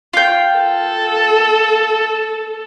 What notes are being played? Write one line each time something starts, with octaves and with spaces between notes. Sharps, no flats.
F4 G5
A4